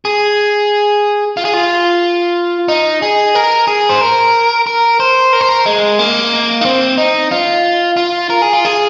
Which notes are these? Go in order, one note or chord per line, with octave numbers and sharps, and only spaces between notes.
G#4
F4
G#4
F4
D#4
G#4
A#4
G#4
C5
A#4
A#4
C5
A#4
C5
A#4
G#3
A#3
D#4
C4
D#4
F4
F4
A#4
G#4
F4
G#4